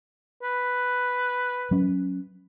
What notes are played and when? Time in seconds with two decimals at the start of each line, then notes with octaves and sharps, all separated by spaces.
0.43 B4
1.71 F#3 C#4